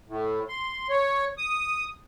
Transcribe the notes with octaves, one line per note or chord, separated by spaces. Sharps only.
A2
C6
C#5
D#6